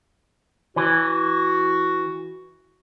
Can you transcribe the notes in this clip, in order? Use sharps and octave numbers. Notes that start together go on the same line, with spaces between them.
E3 F#4